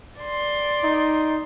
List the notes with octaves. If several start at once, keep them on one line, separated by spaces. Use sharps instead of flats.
D5 C6
D#4